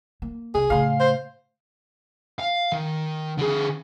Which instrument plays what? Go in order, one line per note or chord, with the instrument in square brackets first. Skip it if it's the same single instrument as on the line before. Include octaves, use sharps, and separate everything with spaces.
[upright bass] A#3
[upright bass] C2 [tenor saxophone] G#4
[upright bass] A2 C#3 [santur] F5 C6
[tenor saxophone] C5
[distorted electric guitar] F5
D#3
D3 G#4